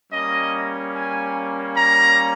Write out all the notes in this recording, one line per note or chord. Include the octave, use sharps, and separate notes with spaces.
G3 A#3 C#4 D#5
G#5
A#5